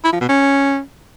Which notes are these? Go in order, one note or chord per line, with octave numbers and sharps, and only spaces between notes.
E4
F3
B2
C#4